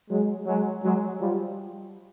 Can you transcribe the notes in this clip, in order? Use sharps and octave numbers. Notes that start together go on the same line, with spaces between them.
F#3 G#3
F#3 G#3
F#3 G#3
F3 G3